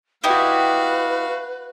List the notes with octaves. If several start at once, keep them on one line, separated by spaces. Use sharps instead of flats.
D#4 E4 F#4 G4 B4 F5